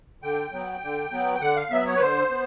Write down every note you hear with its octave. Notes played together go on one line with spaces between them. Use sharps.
D3 G5
F#3 B3
D3
F#3 B3
G5
D3 F#5
F5
F#3 B3 E5
C#5
B4
D3 C5
B3